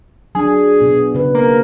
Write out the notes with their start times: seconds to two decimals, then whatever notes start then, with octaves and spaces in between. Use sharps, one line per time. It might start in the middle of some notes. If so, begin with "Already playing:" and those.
0.35 F#3 D4 G#4
0.80 B2 B3
1.15 C#3 B4
1.35 A#3